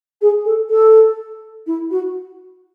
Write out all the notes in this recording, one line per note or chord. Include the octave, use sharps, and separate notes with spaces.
G#4
A4
A4
E4
F#4